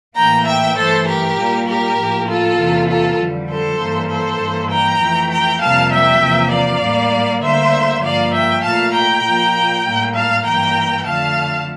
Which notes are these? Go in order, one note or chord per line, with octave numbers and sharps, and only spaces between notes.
A2 E3 A#3 G5 A#5
E5 G5
G2 E3 A3 A4 C5
G4 A#4
A#2 G3 A#3
G4 A#4
A2 F3 A#3
F4 A4
E2 C3 E3 A#3
F4 A4
F2 D3 G3
A4 C5
G2 E3 A#3
A4 C5
G2 E3 A#3
G5 A#5
F2 E3 A3
G5 A#5
F2 C3 G3 A#3 F5 A5
E5 G5
E2 C3 F3 A#3
D5 F5
A2 G3 A#3
D2 D3 G3 A#3 C5 E5
G2 F3 A#3 D5 F5
E5 G5
A#2 A3 F5 A5
G5 A#5
A#2 F3 A#3
A2 G3 A#3
F5 A5
G2 E3 A#3 G5 A#5
F2 D3 A3 F5 A5